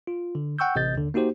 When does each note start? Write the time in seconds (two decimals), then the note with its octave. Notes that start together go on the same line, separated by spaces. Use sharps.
0.07 F4
0.35 D3
0.59 F#5 G5 C#6 E6 G6
0.76 A1 C3 D#5 G6 A6
0.94 D#2 D3
1.14 A#3 D#4 F#4 G4 C5